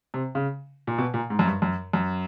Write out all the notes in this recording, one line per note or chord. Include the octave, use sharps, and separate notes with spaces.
C3
C#3
A#2
B2
A#2
G#2
F#2
G2
F#2
F#2